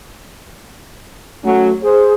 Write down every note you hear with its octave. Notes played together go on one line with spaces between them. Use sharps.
F#3 A3 C#4 F#4
G#4 C5